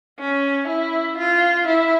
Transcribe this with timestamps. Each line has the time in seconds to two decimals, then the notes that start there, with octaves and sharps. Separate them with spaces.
0.20 C#4
0.68 E4
1.18 F4
1.67 E4